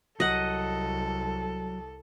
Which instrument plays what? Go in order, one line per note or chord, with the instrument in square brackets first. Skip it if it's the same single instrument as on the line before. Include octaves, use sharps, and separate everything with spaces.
[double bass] C2 [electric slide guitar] F#3 [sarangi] A4 [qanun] D#5 F#5